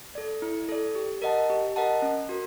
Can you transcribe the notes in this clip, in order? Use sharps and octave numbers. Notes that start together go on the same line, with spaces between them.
A4 D5
E4
A4 D5
G4
A#4 D#5 F#5 A5
G4
A#4 D#5 F#5 A5
C#4
F#4 A#4